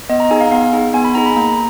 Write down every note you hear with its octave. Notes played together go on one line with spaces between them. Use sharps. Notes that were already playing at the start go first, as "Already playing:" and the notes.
B3 D#5
A#5
D#4 G#4 G#5
F5
B3 F5
D#4 G#4
B3 G#5
B5
D#4 G#4 A#5
B5
A#3 A#5